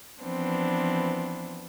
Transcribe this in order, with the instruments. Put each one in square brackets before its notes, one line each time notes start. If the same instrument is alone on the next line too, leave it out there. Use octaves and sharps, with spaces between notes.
[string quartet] E3 F3 B3 C4 D4